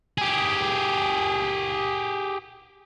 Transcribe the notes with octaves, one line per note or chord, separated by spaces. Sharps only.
G4 G#4